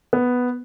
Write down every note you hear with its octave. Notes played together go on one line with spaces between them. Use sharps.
B3